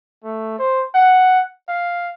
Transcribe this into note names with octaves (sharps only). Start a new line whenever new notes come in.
A3
C5
F#5
F5